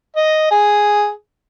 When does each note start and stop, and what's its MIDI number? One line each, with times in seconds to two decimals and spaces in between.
0.16 0.50 75
0.51 1.10 68